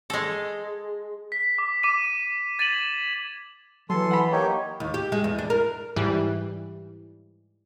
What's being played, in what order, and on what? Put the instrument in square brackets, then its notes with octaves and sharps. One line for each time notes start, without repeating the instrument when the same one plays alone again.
[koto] G#3 A4
[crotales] B6
D6
D6 D#7
G#6 A6 B6 D#7 E7 F#7
[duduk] E3 [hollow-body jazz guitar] F#3 [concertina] A4 C6
[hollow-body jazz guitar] F#5 B5
[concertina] A#3 D#4 G4 [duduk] C#5
[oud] D#2
G4
G#3
E2
D4
A#4
[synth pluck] G#2 E3 G3